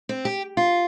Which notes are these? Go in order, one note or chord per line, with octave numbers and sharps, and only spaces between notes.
C4
G4
F4